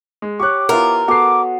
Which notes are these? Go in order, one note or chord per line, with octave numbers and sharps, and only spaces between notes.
G#3
G4 C#5 C#6 D6 F#6
B3 E4 F4 A#4
B3 F#4 A4 D6 C7